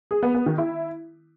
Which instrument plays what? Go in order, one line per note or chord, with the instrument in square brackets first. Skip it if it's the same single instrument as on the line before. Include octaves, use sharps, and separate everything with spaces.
[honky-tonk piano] G#4
B3
B3
D#3
E4